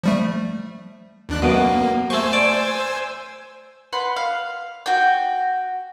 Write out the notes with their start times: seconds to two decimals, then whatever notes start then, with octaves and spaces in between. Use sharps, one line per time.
0.03 F3 G3 A3
1.29 D#2 D4 F#6
1.42 F#2 B2 A#3
2.10 A3 C5 G#5 C#6 E6
2.33 D5
3.93 B4 F#5 C6
4.16 F5
4.86 F#4 G5